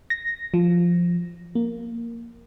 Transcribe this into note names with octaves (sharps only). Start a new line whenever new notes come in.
A#6
F3
A#3